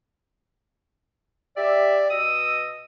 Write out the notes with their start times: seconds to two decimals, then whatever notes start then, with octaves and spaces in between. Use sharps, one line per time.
1.57 G4 D5 E5
2.10 B2 D#5 D#6 E6